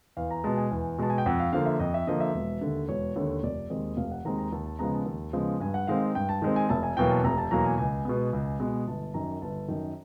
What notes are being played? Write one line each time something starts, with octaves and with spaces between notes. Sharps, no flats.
E2 F5
A#5
B2 G#3 A5
G#5
E2
B2 G#3 A5
G#5
G5
F2 F#5
F5
D3 F3 A#3 F5
E5
F2 D#5
E5
D3 F3 A#3 D#5
E5
E1
D#2 D3
E1 C#5
D#2 D3 C#5
F1 D5
D#2 D#3 G#3 C4 D#5
F1 F5
F#5
D#2 D#3 G#3 C4 A#5
A#5
D#2 A5
A5
C#3 F3 G#3 B3 A#5
A5
D#2
C#3 F3 G#3 B3
G2 G#5
F#5
D#3 G#3 C4 F5
G2 G5
A5
D#3 G#3 C4
G#5
F1 A5
G#5
E2 B2 F#3 A#3 G5
A5
F1 A#5
A5
E2 B2 F#3 A#3 A#5
G#5
C#2 G#5
B2 G#3 B3
C#2
B2 G#3 B3
G1 A5
F#2 D#3 A#5
G1 A5
F#2 D#3